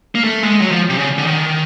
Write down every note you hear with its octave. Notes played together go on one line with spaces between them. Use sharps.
A#3
A3
G#3
F#3
F3
C3
C#3
D3
D#3